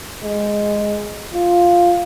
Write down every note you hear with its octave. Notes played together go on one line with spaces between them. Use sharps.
G#3
F4